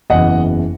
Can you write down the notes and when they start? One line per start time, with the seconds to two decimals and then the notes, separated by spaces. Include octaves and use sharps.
0.10 F#1 E2 C#3 E3 D#5 F#5